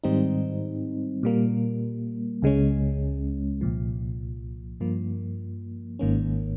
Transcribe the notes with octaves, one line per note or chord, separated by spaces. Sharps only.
G#2 D#3 G3 C4 D#4
A#2 G3 A#3
C#2 C#3 G#3 C#4
C2 A#2 F3
G2 F3 A#3
G#1 G#2 D#3 A#3 C#4